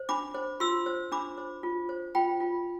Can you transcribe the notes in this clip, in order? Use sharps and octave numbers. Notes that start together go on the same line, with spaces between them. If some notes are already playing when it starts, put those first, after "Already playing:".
Already playing: C5
D4 B5 D6
C5
F4 C6 E6
C5
D4 B5 D6
C5
F4
C5
F4 G5 B5
F4